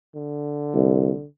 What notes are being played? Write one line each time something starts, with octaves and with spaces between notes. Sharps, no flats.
D3
C2